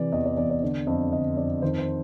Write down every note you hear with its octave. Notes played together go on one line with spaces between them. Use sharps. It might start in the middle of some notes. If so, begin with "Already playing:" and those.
Already playing: C3 E3 D5
E2 D#5
D5
E2 D5
D5
D3 D5
F2 D#5
D3 D#5
F2 D5
D#3 C5
C5